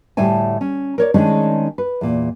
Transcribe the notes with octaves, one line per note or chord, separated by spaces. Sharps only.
D2 A2 G3 A3 G5 G#5
C#4
A#4 C#5 D5
D#3 G#3 A3 C#4 D4 G#4
B4
E2 A#2